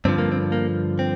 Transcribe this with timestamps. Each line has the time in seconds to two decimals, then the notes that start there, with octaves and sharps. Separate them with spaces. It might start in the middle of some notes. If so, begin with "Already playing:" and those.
0.05 G2 D3 F3 C4
0.18 A#3
0.32 C4
0.52 A#3
0.99 C4